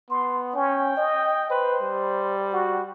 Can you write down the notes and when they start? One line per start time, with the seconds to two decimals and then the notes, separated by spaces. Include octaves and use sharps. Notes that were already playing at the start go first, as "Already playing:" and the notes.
0.10 B3 C6
0.55 C#4 G5
0.97 D#5
1.50 B4 C5
1.81 G3
2.53 F#4